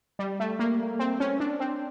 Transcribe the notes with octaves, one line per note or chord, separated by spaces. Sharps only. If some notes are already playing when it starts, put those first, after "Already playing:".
G3
A3
A#3
C4
C#4
D4
C4